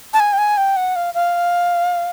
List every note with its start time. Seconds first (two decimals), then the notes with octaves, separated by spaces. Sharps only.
0.13 A5
0.20 G#5
0.33 G5
0.38 G#5
0.57 G5
0.76 F#5
0.96 F5
1.14 F5